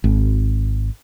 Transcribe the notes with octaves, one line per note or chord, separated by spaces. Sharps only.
G#1